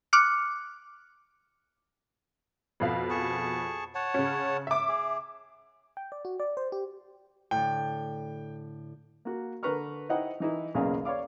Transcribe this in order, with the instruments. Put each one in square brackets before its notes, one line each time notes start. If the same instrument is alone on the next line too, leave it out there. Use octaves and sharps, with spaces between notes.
[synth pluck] D6 F6 F#6 C#7
[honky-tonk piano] F2 B2 F5
[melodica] G#4 A5 C#6
C#5 F#5 A5
[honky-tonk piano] C#3 C#4
E5 D6
[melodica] G#4
[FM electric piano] G5
D5
F#4
D5
C5
G4
[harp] A2 D3 [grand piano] G5
[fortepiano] A#3 F#4
D3 A#4 B4 A#5 C#6 F6
D#4 E4 C5 D#5 F#5 G5
E3 D#4 E4
B1 E2 C#3 A#3 G#4 F5
C#5 D5 F5 D6